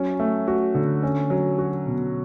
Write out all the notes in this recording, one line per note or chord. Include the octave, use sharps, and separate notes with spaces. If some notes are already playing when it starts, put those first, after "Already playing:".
Already playing: F#3 C#4
A3
F#4
D3
C#4
F#3
F#4
B2